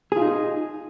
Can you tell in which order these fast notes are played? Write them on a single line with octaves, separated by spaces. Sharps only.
G#4 F4 D#4